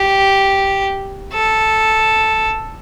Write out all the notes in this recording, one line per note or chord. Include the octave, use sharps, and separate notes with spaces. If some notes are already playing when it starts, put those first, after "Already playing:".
Already playing: G4
A4